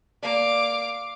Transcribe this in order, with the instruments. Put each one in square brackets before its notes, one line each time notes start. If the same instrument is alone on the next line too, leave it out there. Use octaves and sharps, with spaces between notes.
[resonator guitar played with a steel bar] A#3 D5 [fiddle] F5 D6